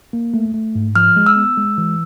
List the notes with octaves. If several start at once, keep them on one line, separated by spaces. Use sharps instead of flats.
A#3
A3
A3
G#2
F3 F6
G#3
E6
B3
G#3
E3